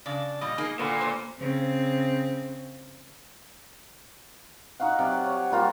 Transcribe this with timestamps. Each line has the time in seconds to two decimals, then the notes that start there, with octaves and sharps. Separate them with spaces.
0.06 C#3 D4
0.41 A#2 G3 D#5
0.58 A#3 D#4 G#4
0.79 A#2 D3 B4
1.01 C5
1.39 C#3 C4
4.80 D#4 F#4 F5 F#5
4.99 C3 F#3 D5
5.26 C#5
5.51 G3 A#3 F4 F#4